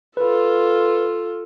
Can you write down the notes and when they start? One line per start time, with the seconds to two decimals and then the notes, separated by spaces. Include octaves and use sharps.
0.17 F4 A4 B4